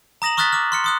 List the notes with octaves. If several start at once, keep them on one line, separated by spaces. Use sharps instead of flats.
A#5 D#6 A#6 E7 F#7
C#6 D#6 F6 F#6 A6 B6
D6 F6
C6 F6 C#7
C6 D#6 F#6